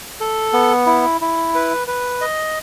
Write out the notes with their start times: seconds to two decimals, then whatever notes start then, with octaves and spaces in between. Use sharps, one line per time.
0.20 A4
0.53 B3
0.86 E4
1.21 E4
1.55 B4
1.88 B4
2.21 D#5